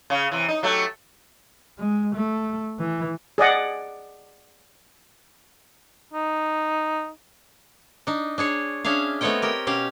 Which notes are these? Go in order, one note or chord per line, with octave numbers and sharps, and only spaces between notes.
C#3
C3 E3
D#4
F#3 A3 G4
G#3
A3
E3
G#4 D5 D#5 F#5
D#4
D4 D#4
D4 G#4 C#5
C#4 D4 G#4 E5 F5
A3 B3 C4 C#5 D#5 G5
G4 A#4 G5
B2 C#4 G4 F5